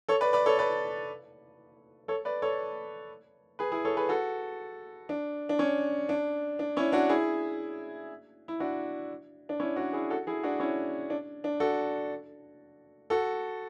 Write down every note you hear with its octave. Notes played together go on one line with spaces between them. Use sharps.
A4 C#5
B4 D5
B4 D5
A4 C#5
B4 D5
A4 C#5
B4 D5
A4 C#5
G#4 B4
E4 G#4
A4 C#5
G#4 B4
F#4 A4
D4
D4
C#4
D4
D4
C#4 E4
D4 F#4
E4 G#4
E4
D4 F#4
D4
C#4 E4
D4 F#4
E4 G#4
F#4 A4
E4 G#4
D4 F#4
C#4 E4
D4
D4
F#4 A4
F#4 A4